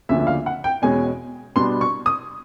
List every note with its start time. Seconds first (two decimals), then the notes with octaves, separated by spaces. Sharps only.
0.09 D2 C#3 F3 A#3 D4 E5
0.20 E5
0.27 F5
0.46 F#5
0.64 G5
0.82 E2 B2 G#3 C#4 G#5
1.56 B2 G3 B3 D4 C6
1.81 C#6
2.06 D#6